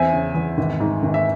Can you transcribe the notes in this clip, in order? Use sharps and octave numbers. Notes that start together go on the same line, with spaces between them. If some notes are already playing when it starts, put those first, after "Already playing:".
Already playing: E2 C4 E5 G#5
C#3
E2
G#1
G#2
G#1
E5